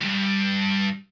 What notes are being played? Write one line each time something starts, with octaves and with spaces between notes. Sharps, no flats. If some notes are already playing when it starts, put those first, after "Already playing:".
C#2 G2